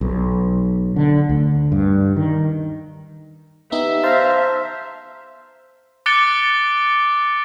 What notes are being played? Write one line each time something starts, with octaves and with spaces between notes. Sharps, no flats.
B1
D3
D2
G2
D#3
B3 D#4 G4 E5
C5 F5 A5 A#5
D6 F#6 A6 C#7 D7 G7